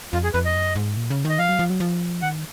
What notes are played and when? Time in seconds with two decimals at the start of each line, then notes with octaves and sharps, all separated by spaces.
0.13 F2 F4
0.24 G#4
0.34 F2 B4
0.45 D#5
0.55 F#2
0.76 G#2
0.97 A#2
1.10 C#3
1.25 D#3 D#5
1.39 F3 F5
1.49 F#3
1.59 F3
1.70 F#3
1.80 F3
2.22 D#3 F#5